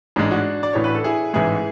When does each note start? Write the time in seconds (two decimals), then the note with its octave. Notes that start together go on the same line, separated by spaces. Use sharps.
0.16 A1 G#2 G#3 D4
0.31 D4 F#4
0.63 D5
0.73 A1 A2 E3 C#5
0.84 B4
0.95 A4
1.04 E4 G#4
1.33 A1 G#2 E3 G#3 E4 G#4